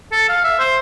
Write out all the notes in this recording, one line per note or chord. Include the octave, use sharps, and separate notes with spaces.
A4
F5
E5
C5